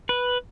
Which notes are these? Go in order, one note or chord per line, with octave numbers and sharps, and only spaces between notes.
B4